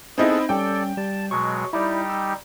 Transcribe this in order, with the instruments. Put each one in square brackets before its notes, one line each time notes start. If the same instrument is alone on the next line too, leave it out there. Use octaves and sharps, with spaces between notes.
[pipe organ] B3 G#4 A4 [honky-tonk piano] C4 D#4 E4
[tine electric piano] G3 C#4 [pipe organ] A4 D5 [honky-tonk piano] G5
[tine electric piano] G3 [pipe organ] A5
[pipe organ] B2 F#3 G#3 [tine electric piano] C#6
[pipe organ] G3 D#4 G4 [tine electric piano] E4 D5
[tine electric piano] E6